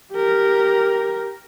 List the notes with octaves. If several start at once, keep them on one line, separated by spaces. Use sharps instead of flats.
G4 A#4